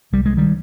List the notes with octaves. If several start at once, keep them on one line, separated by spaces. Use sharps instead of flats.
C2 G3
G#3
D#3 G3